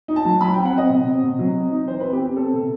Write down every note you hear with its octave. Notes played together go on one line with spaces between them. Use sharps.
D#4
A5
F#3
F#3 B5
C4 G5
F#5
C4 D#5
C3
C4
C3
F#3
C4
D#4
E3 C5
C4 B4
G4
C4
C4 A4
C3